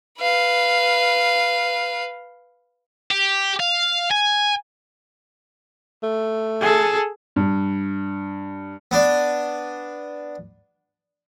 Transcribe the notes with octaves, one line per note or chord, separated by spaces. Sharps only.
B4 F5
G4
F5
G#5
A3
G#4 A4
G2
B3 D4